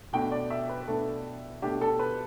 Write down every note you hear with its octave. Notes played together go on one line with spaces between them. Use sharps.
B2 A3 D4 G5
D5
E5
B4
B4
B2 A3 D4 A4
B2 A3 D4 G4
A4
B4